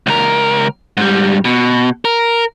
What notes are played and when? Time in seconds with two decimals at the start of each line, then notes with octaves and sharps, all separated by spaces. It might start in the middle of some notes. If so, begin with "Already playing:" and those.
0.07 C#2 A#4
0.97 G#2 G3
1.45 B2
2.05 A#4